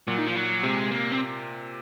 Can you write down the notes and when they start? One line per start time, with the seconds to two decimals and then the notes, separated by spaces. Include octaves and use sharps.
0.07 A#2 F#3
0.18 D#3
0.26 F3
0.35 F#3
0.63 C3 G#3
0.91 A#3
1.12 C4